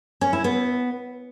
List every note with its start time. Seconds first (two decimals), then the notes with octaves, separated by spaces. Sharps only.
0.21 C#4
0.33 E4
0.44 B3